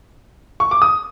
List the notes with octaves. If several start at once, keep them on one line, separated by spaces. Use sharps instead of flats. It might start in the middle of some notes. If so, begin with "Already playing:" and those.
C#6
D6
D#6